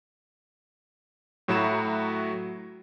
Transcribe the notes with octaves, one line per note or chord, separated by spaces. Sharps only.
A2 F#3 E4 F#4 A#5 E7